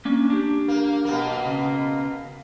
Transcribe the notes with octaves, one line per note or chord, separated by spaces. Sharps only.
A#3 C#4 D4
D4 G4
A#3
B2 A#3
C#3